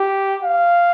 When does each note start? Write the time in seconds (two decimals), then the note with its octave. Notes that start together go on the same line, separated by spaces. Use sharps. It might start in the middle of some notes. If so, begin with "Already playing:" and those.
Already playing: G4
0.43 F5